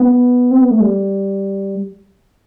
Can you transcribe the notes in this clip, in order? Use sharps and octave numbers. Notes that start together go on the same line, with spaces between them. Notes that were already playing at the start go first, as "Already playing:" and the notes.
Already playing: B3
C4
B3
A3
G3